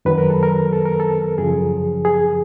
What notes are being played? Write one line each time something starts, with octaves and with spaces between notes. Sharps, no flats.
F#2 D#3 F#3 B4
A#4
A4
A#4
A4
A#4
A4
F#2 C#3 F3 G#4
G#4